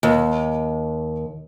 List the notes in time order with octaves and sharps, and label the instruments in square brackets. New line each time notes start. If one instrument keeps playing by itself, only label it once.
[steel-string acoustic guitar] D#2